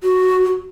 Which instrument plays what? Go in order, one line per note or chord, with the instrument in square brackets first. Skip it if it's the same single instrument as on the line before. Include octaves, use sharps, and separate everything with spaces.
[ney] F#4